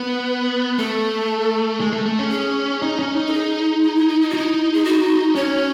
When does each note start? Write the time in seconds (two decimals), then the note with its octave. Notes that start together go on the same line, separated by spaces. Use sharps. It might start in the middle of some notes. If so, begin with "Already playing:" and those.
Already playing: B3 B4
0.79 A3 A4
1.80 G#3
1.93 A3
2.06 A3
2.19 C#4
2.31 G#4
2.82 D#4
2.99 C#4
3.16 D#4
3.28 A4
3.33 G#4
3.84 E4
3.96 E4
4.09 E4
4.21 E4
4.30 F#4
4.34 D#4 E4
4.73 G#4
4.85 F#4
5.36 C#4 C#5